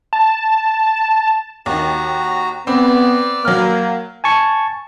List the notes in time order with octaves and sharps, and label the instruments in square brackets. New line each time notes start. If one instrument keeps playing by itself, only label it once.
[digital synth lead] A5
[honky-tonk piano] D#2 D#3 [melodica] F#4 A#5
[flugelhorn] B3 [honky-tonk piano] C4 [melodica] B4 D5
[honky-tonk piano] F#3 F6 [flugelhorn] A#3
[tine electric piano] G#5 A5 C#6